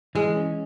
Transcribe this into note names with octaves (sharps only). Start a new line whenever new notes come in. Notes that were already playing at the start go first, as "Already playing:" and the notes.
E3 G#3
C#4